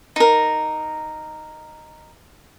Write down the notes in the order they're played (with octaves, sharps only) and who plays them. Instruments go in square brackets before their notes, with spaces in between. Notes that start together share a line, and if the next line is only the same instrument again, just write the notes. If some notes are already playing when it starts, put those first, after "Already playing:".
[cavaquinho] D#4 A#4